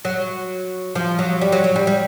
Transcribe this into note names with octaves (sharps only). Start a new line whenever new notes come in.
F#3
F3
F#3
G3
F#3
F#3
G3
G3